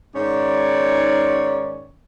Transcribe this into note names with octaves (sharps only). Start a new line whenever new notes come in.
G#2 D#3 C#4 C#5 D5